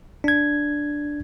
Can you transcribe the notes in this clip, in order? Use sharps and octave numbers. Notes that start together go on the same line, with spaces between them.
D4 G#6